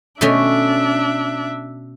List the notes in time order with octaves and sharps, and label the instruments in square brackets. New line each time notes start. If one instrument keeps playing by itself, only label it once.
[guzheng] B2 A3 C#4 [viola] D4 E5